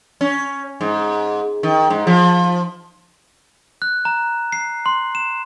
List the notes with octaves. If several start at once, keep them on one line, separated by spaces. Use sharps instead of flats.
C#4
G#2
D#3
G#2
F3
F#6
A#5
C7
C6
E7